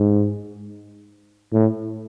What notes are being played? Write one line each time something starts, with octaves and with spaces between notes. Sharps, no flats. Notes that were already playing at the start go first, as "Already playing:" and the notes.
Already playing: G#2
A2